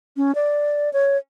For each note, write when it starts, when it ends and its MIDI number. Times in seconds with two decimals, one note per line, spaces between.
0.17 0.35 61
0.35 0.92 74
0.93 1.17 73